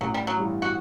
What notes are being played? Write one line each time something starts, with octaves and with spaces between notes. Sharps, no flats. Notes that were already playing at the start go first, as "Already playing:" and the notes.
A1 F#3
G3
F#3
G2 E3
F#4